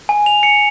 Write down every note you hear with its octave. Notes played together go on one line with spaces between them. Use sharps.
G#5
F7
C#7